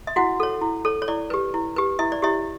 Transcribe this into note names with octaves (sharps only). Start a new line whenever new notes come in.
E5
E4 F#4 F#5
A4 C#5
E4
A4 C#5
C#5
E4 D5
G4 B4
E4
G4 B4
E4 E5
D5
E4 G4 C#5 E5